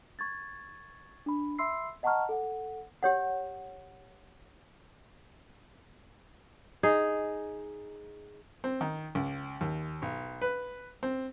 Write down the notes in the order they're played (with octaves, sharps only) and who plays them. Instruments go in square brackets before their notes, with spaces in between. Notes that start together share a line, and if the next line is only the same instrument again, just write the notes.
[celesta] C#6 G#6 A6
D4 B5
E5 B5 C6 E6 C7
D#5 F#5 A5 A#5 C#6 F6
A4 F#5
[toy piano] G4 C#5 F#5
[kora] D#4 G#4
[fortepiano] C4
D#3
C#2
D#2
B1
B4
C4